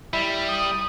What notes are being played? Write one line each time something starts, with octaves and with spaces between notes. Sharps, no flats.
G3 E4
D#6